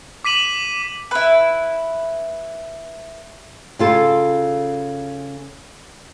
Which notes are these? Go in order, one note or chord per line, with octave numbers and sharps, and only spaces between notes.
D6 B6 D#7 F#7
E4 B4
C#3 F4 A4